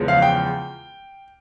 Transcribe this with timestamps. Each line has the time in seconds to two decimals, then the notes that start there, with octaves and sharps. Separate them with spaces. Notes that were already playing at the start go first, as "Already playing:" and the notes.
Already playing: E2 C#3 F3 G#3
0.08 F5
0.22 G5